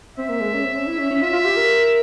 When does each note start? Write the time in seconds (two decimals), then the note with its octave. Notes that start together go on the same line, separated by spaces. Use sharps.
0.18 C4 E5
0.29 A#3
0.41 G#3
0.53 C#4
0.64 C4
0.76 C#4
0.87 E4
0.99 C#4
1.10 C#4
1.22 F4 E5
1.33 F4
1.45 G4
1.57 A#4